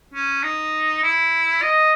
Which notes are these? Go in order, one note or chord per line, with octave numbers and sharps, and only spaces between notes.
C#4
D#4
E4
D#5